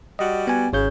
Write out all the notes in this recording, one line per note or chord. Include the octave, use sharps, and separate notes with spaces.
G3 F#4 D#5
B3 G#5
G#1 C#3 C#5 G6